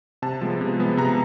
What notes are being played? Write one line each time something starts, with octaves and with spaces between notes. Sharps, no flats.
C3 A5
F3 G#3 B3
C3
F3 G#3 B3
C3 A#5